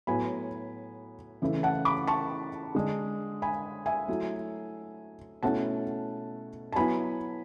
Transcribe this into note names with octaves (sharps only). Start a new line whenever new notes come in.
A2 F#3 B3 G#5 B5
C#3 E3 A3 E4
F#5 A5
B5 D6
A5 C#6
D3 G#3 D4
G#5 B5
E5 G#5
F#3 A3 E4
B2 A3 C#4 E4 F#5 A5
A5
F#3 B3 E4 G#5 B5